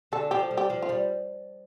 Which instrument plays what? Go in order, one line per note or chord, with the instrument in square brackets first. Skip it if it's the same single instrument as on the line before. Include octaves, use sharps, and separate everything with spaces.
[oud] D3 [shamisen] A4
[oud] F3 [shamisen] G4
[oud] G3
[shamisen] G4
[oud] F3
[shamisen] F4
[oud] G3